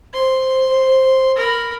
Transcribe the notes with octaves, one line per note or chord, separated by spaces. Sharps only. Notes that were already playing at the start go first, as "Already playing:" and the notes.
C5 C6
A#4 B5